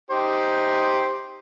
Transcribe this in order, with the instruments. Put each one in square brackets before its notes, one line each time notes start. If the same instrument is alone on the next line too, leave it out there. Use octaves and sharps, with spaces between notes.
[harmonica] D#4 G4 C5